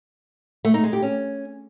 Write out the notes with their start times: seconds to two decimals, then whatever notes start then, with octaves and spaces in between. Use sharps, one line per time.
0.65 A3
0.74 D#4
0.84 G#3
0.93 G4
1.02 C#4